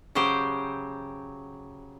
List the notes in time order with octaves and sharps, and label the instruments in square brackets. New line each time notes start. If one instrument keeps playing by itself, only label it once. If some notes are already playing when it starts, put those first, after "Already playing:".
[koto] C#3 F#3 G4 C5